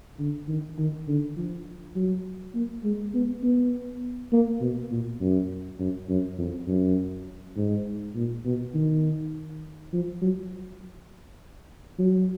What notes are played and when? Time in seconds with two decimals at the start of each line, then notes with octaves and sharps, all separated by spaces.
0.19 D3
0.48 D#3
0.78 D#3
1.07 D3
1.37 F3
1.96 F#3
2.55 A#3
2.84 G#3
3.14 B3
3.43 B3
4.32 A#3
4.61 B2
4.91 A#2
5.21 F#2
5.79 F#2
6.09 F#2
6.39 F2
6.68 F#2
7.57 G#2
8.16 A#2
8.45 B2
8.74 D#3
9.93 F3
10.22 F#3
11.99 F#3